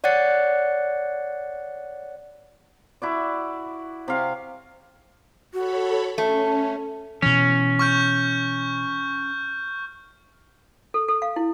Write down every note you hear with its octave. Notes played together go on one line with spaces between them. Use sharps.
C#5 D5 F#5 F#6 A6 C#7
E4 F#4 D5
C3 F5
F#4 A4 C#5 B5
A3 C#4 A5
B2 E3 C#4
C#6 F6 G6
A4
A4
F5
E4